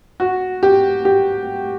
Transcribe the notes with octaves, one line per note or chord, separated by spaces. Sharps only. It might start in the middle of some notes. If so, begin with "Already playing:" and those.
F#4
G4
G4